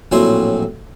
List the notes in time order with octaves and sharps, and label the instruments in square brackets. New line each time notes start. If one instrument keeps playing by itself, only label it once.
[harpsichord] A#1 A2 F#3 C4 G#5 C6